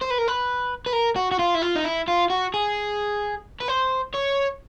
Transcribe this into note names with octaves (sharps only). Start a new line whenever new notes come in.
C5
B4
A#4
B4
B4
A#4
F#4
F#4
F4
E4
F4
D#4
E4
F4
F#4
G#4
B4
C5
C#5